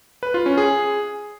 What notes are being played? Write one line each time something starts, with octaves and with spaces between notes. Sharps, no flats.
B4
F4
C#4
G#4